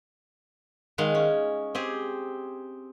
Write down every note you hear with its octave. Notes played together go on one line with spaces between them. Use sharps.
D#3 G#3 F5 F#5
C#4
C4 G4 G#4